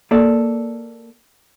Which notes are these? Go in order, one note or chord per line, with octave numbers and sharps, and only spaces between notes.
A#3 A4 D5